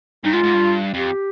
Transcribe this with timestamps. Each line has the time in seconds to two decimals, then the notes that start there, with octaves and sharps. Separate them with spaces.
0.24 G2 D#4
0.33 G#2 F4
0.44 G#2
0.54 G2
0.94 F2 G4